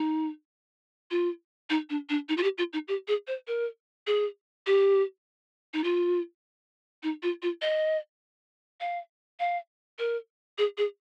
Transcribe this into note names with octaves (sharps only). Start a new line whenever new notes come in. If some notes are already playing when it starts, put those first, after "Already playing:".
Already playing: D#4
F4
D#4
D4
D4
D#4
F4
G4
F4
D#4
G4
G#4
C5
A#4
G#4
G4
D#4
F4
D#4
F4
F4
D#5
F5
F5
A#4
G#4
G#4